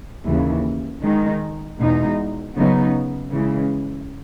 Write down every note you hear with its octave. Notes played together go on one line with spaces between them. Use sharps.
D#2 C#3 E3
D#3 G#3 D#4
E2 B2 G#3 D#4
C#3 F#3 B3 D#4
C#3 E3 G#3